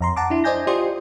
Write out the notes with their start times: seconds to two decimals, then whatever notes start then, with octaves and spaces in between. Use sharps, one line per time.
0.01 F2 A#5 C6
0.16 F#5 A5 A#5 D6
0.30 D4 E4
0.44 C5 D5 D#5 G#5 G6 A#6
0.67 F4 G4 C5 D5 C6 D#6